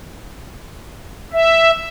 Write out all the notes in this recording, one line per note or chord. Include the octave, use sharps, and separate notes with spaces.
E5